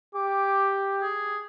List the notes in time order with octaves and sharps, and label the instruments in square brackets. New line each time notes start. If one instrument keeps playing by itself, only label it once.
[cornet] G4 [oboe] D6
[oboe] G#4